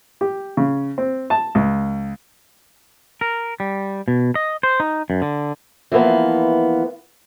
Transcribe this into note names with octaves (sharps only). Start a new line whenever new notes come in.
G4
C#3
C4
A5
C#2
A#4
G3
B2
D#5
C5
D#4
F#2
D3
E3 F3 A#3 B3